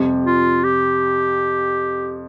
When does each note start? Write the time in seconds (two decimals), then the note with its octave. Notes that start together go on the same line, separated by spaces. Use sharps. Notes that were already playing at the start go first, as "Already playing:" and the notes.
Already playing: F2 C3 G3
0.26 F4
0.64 G4